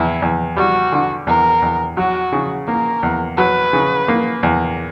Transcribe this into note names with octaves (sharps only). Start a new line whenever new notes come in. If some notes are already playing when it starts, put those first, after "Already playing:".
Already playing: E2 E4
E2
G3 F#4
D3
E2 A#4
E2
F#3 F#4
C#3
A#3 A#4
E2
F#3 B4
C#3
A#3
E2